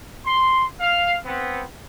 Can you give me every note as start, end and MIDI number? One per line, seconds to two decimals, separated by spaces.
0.24 0.64 84
0.80 1.14 77
1.24 1.62 59
1.24 1.62 60